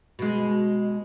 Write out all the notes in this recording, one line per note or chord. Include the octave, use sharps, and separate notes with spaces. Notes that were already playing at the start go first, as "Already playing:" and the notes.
B2 G#3